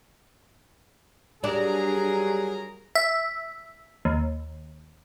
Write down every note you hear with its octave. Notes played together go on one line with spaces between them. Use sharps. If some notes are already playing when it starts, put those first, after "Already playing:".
F#3 G3 D4 G#4 A#4 A#5
E5
D#2